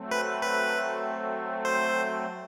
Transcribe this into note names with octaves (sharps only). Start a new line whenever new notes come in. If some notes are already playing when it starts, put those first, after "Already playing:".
Already playing: F#3 A3 C4
B4
B4
C5